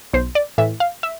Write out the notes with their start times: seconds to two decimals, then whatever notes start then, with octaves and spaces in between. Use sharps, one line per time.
0.13 B1 C5
0.35 D5
0.58 A2 E3 E5
0.80 F5
1.03 E5